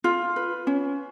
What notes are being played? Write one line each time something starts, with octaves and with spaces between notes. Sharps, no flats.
F4
B4
C#4